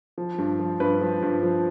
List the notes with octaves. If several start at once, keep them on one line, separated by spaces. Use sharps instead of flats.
F3
G2
F3
G2 B4
F3
G2
F3